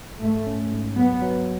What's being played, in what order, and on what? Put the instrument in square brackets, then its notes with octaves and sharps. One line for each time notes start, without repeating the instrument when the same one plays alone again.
[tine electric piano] G#2 [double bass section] A3
[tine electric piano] C#4
G#2
[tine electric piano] F#3 [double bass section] B3
[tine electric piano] F#3